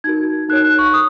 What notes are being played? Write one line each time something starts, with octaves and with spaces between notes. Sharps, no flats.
D#4 F#4 A#4 G#6
D#4 A#4 C#5 F#6
F#6
C#6
D#6